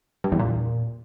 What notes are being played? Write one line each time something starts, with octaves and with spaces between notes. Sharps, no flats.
G2
E2
A#2